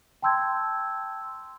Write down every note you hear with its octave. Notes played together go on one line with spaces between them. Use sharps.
G5 A5 C6 E6 G6 G#6